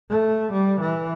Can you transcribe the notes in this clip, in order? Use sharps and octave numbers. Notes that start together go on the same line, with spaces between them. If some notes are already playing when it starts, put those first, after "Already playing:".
A3
G3
E3